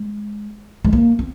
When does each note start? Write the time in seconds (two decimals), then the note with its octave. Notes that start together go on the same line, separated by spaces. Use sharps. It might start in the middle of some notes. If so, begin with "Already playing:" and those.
Already playing: G#3
0.84 G#3
0.93 A#3
1.19 C4